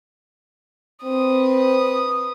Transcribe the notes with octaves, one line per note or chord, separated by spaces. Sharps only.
C4 B4 D#6